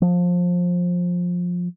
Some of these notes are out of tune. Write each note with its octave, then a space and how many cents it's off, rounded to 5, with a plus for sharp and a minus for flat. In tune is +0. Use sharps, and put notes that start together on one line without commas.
F3 +20